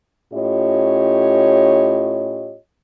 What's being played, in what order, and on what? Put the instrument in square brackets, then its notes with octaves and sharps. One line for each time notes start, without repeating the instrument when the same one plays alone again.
[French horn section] A2 C#4 F4 G4 C#5 D#5